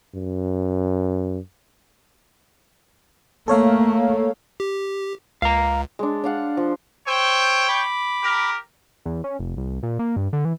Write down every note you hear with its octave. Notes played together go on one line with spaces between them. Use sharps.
F#2
A3 A#3 A4 C#5 F5
G4
C#2 F5 A#5
G#3 D4
D4 F5 F#5
F3
C5 C#5 G5 E6
B5 D6
G4 A#4
E2
C#4
F1
C2
A#2
A#3
G2
D3
E3